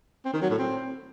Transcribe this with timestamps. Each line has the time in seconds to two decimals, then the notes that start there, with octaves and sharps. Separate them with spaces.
0.25 C4
0.33 D#3
0.42 F#3
0.50 A2
0.59 C4